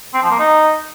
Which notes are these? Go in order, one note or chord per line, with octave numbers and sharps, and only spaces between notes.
C4
F3
A#3
D#4